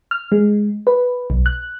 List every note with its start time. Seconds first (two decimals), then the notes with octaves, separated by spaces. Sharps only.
0.11 F6
0.32 G#3
0.87 B4
1.30 B1
1.46 F#6